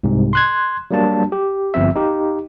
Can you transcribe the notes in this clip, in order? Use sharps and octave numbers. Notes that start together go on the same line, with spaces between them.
C2 G#2 C3
C6 F#6 G#6
F#3 G3 A#3 D4 A5
G4
G1 F3 C4 E5
D#4 G4